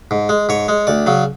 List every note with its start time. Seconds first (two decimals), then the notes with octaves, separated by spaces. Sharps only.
0.11 G#2
0.29 G#3
0.49 G#2 C#5
0.68 G#3
0.87 D2 D5
1.06 C#3 F#3